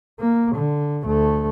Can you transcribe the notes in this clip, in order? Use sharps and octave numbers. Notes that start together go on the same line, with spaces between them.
A#3
D3
D2 A3